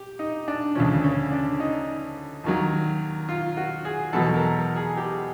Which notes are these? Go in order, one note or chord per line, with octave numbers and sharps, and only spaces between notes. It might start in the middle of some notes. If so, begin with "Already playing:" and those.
Already playing: G4
D#4
D4
D2 C#3 F3 C#4
C#4
D4
D#4
D#2 D#3 F#3
F4
F#4
G#4
E2 B2 F#3 A4
A#4
G#4
G4